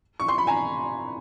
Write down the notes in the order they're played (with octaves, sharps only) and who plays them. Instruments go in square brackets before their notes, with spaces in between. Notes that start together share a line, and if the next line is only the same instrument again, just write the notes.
[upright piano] C#6
C6
B5
G#5 A#5